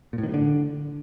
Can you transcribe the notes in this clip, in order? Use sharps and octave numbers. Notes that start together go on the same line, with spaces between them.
A#2
A2
D#3
G2
D3